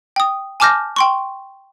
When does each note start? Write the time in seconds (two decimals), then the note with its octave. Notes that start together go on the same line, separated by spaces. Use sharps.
0.16 G5 D#6
0.60 G#5 A5 D6 F6 G6 A#6
0.96 G5 C6 C#6